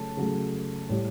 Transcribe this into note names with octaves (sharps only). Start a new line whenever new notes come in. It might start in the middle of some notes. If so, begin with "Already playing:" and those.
Already playing: C#3 F#3 A3 A5
C#3 F#3 A3
A2 G3